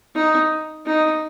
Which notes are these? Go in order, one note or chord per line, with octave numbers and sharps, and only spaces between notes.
D#4
D#4